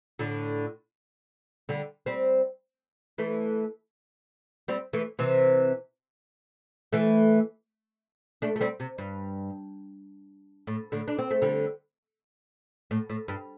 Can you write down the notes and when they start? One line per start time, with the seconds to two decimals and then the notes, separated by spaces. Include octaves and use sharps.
0.19 A2 D3
1.69 D3 G3
2.06 G3 C4
3.18 E3 A3
4.68 G3 C4
4.93 E3 A3
5.19 C3 E3
6.92 E3 A3
8.42 A3 D4
8.56 A3
8.61 G3 C4
8.80 C3
8.98 G2
10.67 A2
10.92 A2 D3
11.08 D4
11.19 C4
11.31 A3
11.42 D3 G3
12.91 A2
13.10 A2
13.28 G2